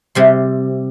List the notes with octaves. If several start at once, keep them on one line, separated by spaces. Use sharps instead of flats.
C3 G3 C6